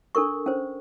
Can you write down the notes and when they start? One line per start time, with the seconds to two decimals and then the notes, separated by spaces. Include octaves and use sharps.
0.15 D4 A4 A#4 C#6
0.46 C#4 C5